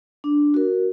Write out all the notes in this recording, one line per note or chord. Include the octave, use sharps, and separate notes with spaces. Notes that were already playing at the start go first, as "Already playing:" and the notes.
D4
F#4 A#4